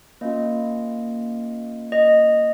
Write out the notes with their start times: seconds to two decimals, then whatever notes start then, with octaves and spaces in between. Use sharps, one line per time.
0.21 A#3 C#4 F4 D#5
1.92 D#5